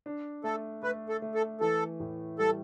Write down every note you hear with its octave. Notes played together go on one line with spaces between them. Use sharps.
D4
A3 A4
A3 B4
A4
A3
A4
E3 A4
A2
G3 A4